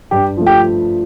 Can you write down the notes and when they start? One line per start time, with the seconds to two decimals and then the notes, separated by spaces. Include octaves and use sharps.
0.11 G2 G4
0.37 F3 A3
0.47 G4